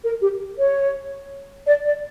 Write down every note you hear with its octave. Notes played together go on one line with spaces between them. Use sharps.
A#4
G4
C#5
D5
D5